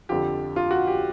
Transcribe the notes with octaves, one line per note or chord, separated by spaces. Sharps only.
F2 D3 F3 G4
F4
F#4
G4